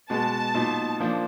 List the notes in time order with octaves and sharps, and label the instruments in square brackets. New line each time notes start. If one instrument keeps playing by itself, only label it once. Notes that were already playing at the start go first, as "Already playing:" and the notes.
[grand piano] B2 G#3 B3 [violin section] A5
[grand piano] A#2 F#3 B3 D#4
A#2 F3 A#3 D4